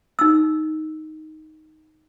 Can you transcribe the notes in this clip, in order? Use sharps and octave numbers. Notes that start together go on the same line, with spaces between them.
D#4 E6